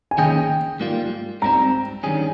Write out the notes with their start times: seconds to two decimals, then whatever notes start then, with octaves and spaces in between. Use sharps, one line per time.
0.11 G#5
0.18 D#3 A#3 C#4 G#4 D#5 G5
0.80 G#2 G3 A#3 F4
1.42 G#2 G3 C4 A#5
2.03 G2 D#3 G3 C#4 G#4